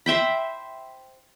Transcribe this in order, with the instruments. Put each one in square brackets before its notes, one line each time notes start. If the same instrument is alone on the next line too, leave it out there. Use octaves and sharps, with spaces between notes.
[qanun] C5 E5 G5 B5